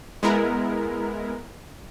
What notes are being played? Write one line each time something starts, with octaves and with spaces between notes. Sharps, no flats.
G#3 B3 E4 A#4